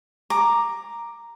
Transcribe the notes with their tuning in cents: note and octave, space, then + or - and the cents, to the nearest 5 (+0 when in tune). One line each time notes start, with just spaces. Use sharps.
A#5 +0 D6 +10